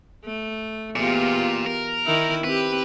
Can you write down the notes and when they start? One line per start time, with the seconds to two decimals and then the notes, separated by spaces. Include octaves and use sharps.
0.25 A3
0.96 E2 A#2 F4 G4
1.66 A#4
2.05 D#3 D#4 E4
2.44 C4 G4 B4